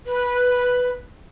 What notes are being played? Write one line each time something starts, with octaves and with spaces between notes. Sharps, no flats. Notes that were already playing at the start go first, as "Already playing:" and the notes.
B4